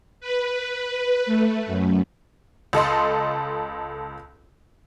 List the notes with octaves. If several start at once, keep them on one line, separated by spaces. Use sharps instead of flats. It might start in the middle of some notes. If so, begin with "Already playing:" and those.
B4
A3
F#2
C#2 A4 D#5 C6